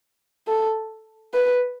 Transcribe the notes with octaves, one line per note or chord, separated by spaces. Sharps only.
A4
B4